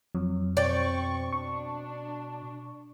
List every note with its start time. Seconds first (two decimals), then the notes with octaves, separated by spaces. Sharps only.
0.15 F2 F#3
0.57 B2 C4 D5 G5 C#6
1.32 D4 C#6